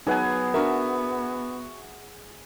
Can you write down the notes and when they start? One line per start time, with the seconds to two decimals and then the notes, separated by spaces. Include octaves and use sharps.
0.07 F#3 B3 D#4 G#4 B4 F#5 G#5
0.54 D4 F#4 A#4 E5